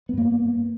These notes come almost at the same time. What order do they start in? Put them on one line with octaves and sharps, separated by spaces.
B3 G2 A#3